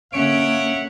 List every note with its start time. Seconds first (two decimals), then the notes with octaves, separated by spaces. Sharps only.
0.13 D3 A#3 C#4 C#5 E5 F#5 D7